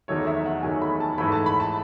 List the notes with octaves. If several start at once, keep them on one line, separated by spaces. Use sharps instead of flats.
E2 D#3 F#3 A3 C#5
E5
F#5
E2 D#3 F#3 A3 G#5
B5
A5
G#2 E3 A3 B5
A5
B5
A5